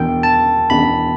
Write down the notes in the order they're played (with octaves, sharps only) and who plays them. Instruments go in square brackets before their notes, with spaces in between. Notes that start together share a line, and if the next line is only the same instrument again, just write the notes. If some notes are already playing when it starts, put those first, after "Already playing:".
Already playing: [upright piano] E1 E2 B2 B3 D4 [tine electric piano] G5
[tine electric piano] A5
[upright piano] E1 E2 B2 B3 D4 [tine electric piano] B5